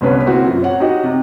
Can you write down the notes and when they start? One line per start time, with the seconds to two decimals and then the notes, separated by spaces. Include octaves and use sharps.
0.01 G1 C2 C#4 B4
0.26 A#3 C4 E4 F#4
0.47 F#2 A#2
0.63 C#5 F#5
0.80 D#4 F#4 G4 D#5
1.03 C3